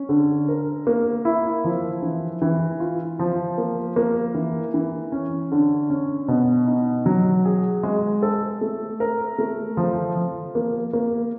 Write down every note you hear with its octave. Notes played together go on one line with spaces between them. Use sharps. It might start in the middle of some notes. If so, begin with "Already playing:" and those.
Already playing: C#4
D3
A#4
A#3
E4
F3
E3
E3
F4
F3
A#3
A#3
E3
E3
C#4
D3
C#4
B2
D#4
F#3
G#4
G#3
A4
A3
A#4
A3
F3
F3
A#3
A#3